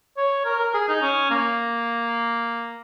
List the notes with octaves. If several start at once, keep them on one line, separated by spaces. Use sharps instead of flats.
C#5
A#4
A#4
G#4
D#4
C#4
A#3